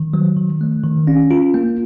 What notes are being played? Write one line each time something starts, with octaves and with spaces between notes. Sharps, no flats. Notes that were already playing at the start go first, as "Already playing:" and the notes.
Already playing: D#3
F#3
D#3
A3
D#3
C#4
F4
A#3